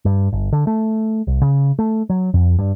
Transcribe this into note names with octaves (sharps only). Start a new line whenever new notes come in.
G2
G1
D3
A3
C2
C#3
A3
F#3
F2
G2